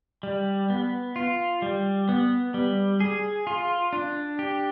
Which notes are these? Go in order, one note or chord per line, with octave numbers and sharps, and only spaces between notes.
G3
B3
F4
G3
B3
G3
G#4
F4
D4
G4